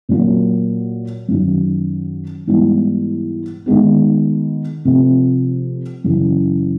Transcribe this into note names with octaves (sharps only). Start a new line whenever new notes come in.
A#2 F#3 A#3
F#2 D#3 F#3
G#2 E3 G3 B3 E4
D#3 G#3 B3
C3 F3 A3 C4
F#2 C#3 E3